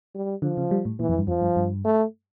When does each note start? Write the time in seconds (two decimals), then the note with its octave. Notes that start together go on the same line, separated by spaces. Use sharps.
0.15 G3
0.42 D3 F3
0.57 C#3
0.71 G3
0.85 A2
0.99 A#2 E3
1.09 F2
1.18 G2
1.27 F2 F3
1.42 G2
1.56 G2
1.85 A3